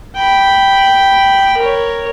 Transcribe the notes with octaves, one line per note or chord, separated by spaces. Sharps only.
G5 B5
A#4 C#5